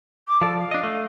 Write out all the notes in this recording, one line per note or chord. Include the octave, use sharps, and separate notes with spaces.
D6
F3 A4 D5
F5
D4 D#5
A3